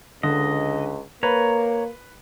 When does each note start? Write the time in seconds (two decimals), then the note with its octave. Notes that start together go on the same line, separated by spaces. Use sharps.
0.23 C#2 D3 D#5
1.23 A#3 B4 C#5 A#5